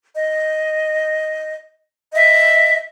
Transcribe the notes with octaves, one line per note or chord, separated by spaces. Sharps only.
D#5
D#5 E5